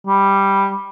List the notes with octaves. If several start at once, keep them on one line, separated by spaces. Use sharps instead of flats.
G3